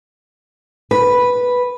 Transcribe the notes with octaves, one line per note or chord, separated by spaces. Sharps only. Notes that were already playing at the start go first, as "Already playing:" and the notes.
B4